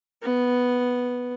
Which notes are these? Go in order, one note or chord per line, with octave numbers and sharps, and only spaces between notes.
B3